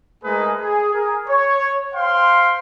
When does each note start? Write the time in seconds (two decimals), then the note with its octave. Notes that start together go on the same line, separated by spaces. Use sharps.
0.24 G#3 A3 D#4 G#4 A#4 B4
0.61 G#4
0.93 G#4 A#4
1.28 C#5
1.94 C5 F5 G5 C6